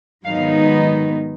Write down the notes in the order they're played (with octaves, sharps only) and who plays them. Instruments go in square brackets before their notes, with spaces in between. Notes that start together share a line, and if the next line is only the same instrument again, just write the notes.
[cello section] G#2 D#3 F#3 B3 D#4 F5